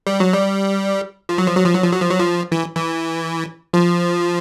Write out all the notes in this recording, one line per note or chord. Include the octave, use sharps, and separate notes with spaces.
G3
F#3
G3
F3
F#3
F3
F#3
F3
F#3
F3
F#3
F3
F#3
F3
E3
E3
F3